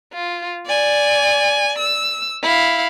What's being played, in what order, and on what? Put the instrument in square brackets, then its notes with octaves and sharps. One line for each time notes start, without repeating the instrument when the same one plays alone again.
[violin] F4
D5 G#5
E6
E4 F5